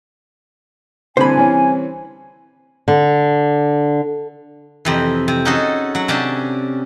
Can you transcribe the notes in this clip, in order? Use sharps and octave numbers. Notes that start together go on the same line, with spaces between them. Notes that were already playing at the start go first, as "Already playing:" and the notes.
C2 D3 E3 C5 G#5 B5
E3 C#4
D3
F2 C3 E3
C3
C#4 D#4 F#4 G#4 A4
F#3 F#5
C3 C#4 D4 A5